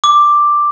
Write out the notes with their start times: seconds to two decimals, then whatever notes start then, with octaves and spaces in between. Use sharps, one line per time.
0.04 D6